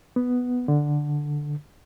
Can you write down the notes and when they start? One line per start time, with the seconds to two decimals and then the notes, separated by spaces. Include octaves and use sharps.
0.16 B3
0.68 D3